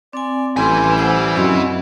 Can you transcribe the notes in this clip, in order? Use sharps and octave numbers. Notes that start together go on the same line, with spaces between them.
C4 D5 G#5
A1 G3 E4 B4 G5 G#5 C6
C5 F#5 E6
F#2 C4 C#4 D#5